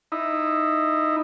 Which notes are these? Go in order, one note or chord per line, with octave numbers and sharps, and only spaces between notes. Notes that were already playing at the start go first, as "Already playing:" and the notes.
D#4 E4